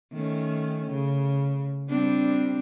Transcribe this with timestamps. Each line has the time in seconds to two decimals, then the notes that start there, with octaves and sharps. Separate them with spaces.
0.12 D#3 A3 C#4
0.91 C#3
1.89 G3 C4 D4